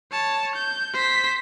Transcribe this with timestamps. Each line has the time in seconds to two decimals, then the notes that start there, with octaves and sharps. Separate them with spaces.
0.12 C#5 A5
0.55 G6
0.94 C5 B6